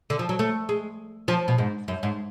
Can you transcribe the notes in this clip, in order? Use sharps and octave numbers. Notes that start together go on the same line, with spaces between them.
D3
F3
F#3
A3
G#3
F3
B2
G#2
F#2
G#2